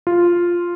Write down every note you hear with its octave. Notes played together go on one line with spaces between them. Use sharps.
F4